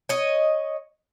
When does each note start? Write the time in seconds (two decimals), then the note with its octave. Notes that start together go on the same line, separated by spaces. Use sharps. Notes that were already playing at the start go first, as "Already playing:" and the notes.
0.09 C#5 D#5